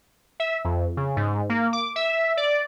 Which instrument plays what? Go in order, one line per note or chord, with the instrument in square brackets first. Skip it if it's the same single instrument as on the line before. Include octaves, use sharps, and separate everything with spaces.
[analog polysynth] E5
F2
C#3
G#2
A#3
D6
E5
D5